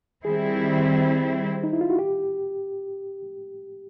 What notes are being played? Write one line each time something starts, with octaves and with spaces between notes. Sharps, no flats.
D#3 G3 C4 E4 G#4
D#4
E4
F4
F#4
G4